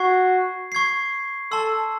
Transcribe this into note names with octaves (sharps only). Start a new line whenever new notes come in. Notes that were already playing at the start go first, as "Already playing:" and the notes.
Already playing: F#4 C#6 G#6 C7
C#6 G#6 C7
A4 A5 C6 E6